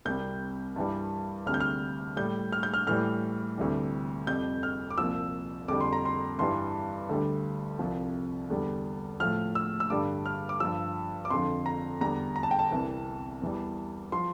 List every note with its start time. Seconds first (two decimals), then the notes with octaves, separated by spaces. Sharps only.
0.05 C2 C3 G3 G6
0.76 G2 E3 G3
1.46 D2 C3 G3 F6
1.54 G6
1.60 F6
2.17 A2 G3 G6
2.53 F6
2.63 G6
2.74 F6
2.87 A2 E3 G3 F6
3.58 D2 C3 E3 G3
4.27 F2 C3 G3 G6
4.63 F6
4.90 D6
4.98 C2 A#2 F3 E6
5.68 F2 D3 G3 D6
5.80 C6
5.93 A#5
6.05 C6
6.39 G2 E3 G3 C6
7.09 D2 D3 G3
7.79 C2 C3 F3
8.50 E2 D3 G3
9.20 A2 F3 F6
9.55 E6
9.80 E6
9.90 G2 D3 G3 D6
10.26 F6
10.49 D6
10.60 G2 F3 E6
11.25 D6
11.30 F2 D3 F3 C6
11.66 A#5
12.01 E2 D3 G3 A#5
12.36 A#5
12.43 A5
12.51 G5
12.59 A5
12.71 C2 C3 E3
13.42 E2 E3 G3
14.12 F3 C6